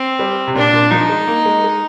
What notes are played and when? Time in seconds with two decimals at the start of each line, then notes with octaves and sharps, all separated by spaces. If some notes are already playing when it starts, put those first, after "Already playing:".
Already playing: C4
0.19 G3
0.48 C3
0.55 A#2 D4
0.73 A#2
0.91 F3 D#4
1.09 G#3
1.28 A#3
1.46 G#3
1.64 G#3